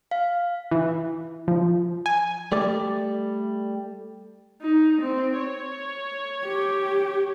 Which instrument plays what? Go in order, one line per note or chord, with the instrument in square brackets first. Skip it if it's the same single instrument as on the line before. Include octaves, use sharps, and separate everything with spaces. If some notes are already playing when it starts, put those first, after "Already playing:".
[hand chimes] F5
[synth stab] E3
F3
G#5
[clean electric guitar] G3 A3 D5
[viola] D#4
C4
C#5
[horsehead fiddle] G4